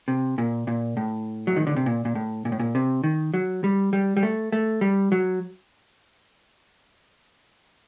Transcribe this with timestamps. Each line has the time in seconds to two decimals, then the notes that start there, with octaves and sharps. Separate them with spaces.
0.08 C3
0.38 A#2
0.67 A#2
0.97 A2
1.47 F#3
1.57 D#3
1.67 D3
1.76 C3
1.86 A#2
2.05 A#2
2.15 A2
2.45 A#2
2.52 A2
2.59 A#2
2.75 C3
3.04 D#3
3.34 F#3
3.64 G3
3.93 G3
4.17 G3
4.23 A3
4.52 A3
4.81 G3
5.12 F#3